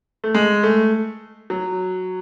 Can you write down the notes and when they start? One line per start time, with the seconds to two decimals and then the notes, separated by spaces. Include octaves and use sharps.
0.24 A3
0.35 G#3
0.63 A3
1.50 F#3